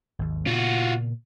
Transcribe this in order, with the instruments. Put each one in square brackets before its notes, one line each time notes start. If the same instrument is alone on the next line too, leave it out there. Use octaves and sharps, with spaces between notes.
[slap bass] G#1 D#2
[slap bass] A#2 C#3 B3 [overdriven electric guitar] F4 F#4